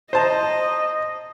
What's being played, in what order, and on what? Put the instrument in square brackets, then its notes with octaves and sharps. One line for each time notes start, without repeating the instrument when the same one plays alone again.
[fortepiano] C5 A5 A#5 [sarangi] D#5